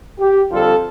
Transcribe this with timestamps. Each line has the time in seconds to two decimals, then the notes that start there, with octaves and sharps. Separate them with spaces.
0.19 G4
0.51 F2 D3 G3 F4 A4